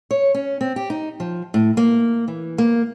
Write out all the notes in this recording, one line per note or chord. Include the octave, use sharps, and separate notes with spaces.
C#5
C#4
C4
G4
D#4
F3
A2
A#3
E3
A#3